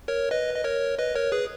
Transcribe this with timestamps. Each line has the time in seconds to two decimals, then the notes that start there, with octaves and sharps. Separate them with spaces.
0.08 A#4 C#5
0.31 B4 D#5
0.55 D#5
0.64 A#4 C#5
0.99 B4 D#5
1.15 A#4 C#5
1.32 G#4 B4